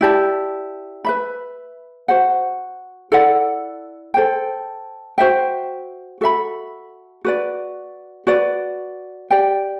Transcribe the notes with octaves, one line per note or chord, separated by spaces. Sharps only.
E4 G4 D5 A5
B4 E5 B5
F#4 C5 F#5
E4 A4 D5 F#5
A4 C5 G5
F#4 C5 E5 G5
F#4 A4 E5 B5
F#4 B4 D5
F#4 B4 D5
G4 D5 G5